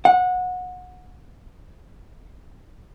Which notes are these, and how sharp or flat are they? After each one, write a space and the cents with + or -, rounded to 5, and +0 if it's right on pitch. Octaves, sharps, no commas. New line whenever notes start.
F#5 -25